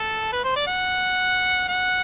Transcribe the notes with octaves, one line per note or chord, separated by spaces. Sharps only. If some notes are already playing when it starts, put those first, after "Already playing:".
Already playing: A4
B4
C5
D5
F#5
F#5